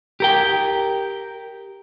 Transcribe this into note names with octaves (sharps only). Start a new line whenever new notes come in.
G4 A#4 G5